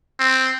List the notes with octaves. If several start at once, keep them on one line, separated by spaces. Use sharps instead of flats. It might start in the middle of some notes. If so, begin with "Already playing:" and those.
C4